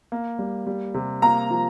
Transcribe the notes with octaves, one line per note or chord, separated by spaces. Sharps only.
A#3
G3
G3
C3
A#3 A#5
F3